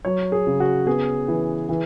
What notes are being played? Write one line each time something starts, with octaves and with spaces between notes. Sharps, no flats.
F#3 C#5
G#4
C#3
F#4
B3 G#4
E3
E3